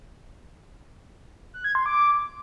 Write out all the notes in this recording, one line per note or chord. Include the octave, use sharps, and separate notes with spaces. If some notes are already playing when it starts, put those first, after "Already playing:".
F#6
G#6
C6
D6